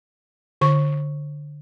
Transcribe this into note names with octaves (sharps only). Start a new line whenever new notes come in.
D3 C#6